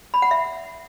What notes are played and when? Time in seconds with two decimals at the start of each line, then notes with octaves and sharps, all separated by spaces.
0.14 B5
0.22 F#5
0.31 E5